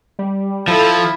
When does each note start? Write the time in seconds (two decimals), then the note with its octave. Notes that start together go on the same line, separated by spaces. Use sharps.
0.19 G3
0.68 F3 E4 A4